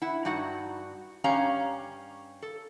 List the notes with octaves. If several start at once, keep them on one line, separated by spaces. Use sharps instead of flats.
E4 F#5
G2 D#4 F#4 F#5
G2 C#4 G4 C#5 F5 A#5
A4